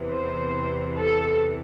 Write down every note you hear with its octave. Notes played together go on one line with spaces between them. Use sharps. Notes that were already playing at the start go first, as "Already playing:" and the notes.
Already playing: E2 C3 E3
C5
A4